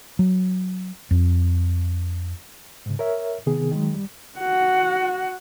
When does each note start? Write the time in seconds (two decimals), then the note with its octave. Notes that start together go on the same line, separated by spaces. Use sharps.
0.19 F#3
1.11 F2
2.86 G#2 C#3
2.99 A#4 C#5 E5
3.46 C3 D#3 B3 G#4
3.71 D#3 F#3 G#3
3.94 G3
4.39 F#4 F#5